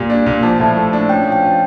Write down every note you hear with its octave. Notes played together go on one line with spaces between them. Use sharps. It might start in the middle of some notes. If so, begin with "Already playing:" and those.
Already playing: A#2 G3
D4
A#2
F3 A5
A2
A3
D4
C#4 G5
F3
G5
F4